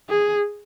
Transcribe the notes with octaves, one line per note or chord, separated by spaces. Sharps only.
G#4